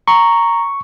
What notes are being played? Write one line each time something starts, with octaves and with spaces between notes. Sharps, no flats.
A#5 C#6